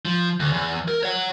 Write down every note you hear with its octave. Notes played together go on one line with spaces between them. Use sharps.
F3
D2
E2
A#4
C#5 F#5